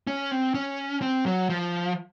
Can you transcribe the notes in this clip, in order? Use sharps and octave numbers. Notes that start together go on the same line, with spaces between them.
C#4
C4
C#4
C4
F#3
F3